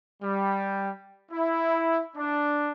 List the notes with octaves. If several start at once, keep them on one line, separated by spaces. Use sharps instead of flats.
G3
E4
D4